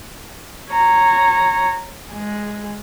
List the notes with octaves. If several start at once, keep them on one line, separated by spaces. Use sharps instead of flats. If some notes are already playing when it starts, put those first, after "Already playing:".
C#5 A#5
G#3